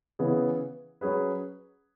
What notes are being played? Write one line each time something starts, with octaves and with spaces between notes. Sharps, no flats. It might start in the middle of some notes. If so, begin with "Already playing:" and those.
C#3 E3 B3 G#4
F#3 C#4 G#4 B4